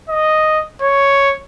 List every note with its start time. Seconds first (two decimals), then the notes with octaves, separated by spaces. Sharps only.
0.09 D#5
0.82 C#5